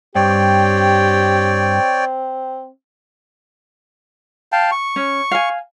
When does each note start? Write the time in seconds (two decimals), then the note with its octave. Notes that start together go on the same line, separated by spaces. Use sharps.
0.15 G2 C4 G4 C#5 D5 G5
4.52 F5 G5 A5
4.72 C#6
4.96 C#4
5.31 F5 G#5